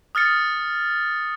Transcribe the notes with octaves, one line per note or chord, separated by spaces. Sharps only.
D#6 F6 A6 C#7